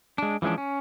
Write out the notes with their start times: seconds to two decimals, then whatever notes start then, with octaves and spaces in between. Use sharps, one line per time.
0.18 G#3 D4
0.42 E3 F3 G#3 C#4 D4
0.58 C#4